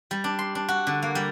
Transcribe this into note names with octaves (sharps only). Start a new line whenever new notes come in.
G3
D4
C6
D4
F#4
D3
A#3
G3